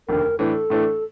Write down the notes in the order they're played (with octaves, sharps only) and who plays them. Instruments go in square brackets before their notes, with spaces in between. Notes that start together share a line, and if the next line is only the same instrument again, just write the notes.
[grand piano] F1 D#2 D3 [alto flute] A#4
[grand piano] A2 E3 A3 D4 [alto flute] A4
[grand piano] A2 E3 A3 D4